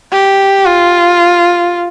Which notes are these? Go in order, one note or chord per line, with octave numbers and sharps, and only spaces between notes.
G4
F4